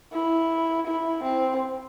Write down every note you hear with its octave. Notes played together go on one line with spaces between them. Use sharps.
E4
E4
C4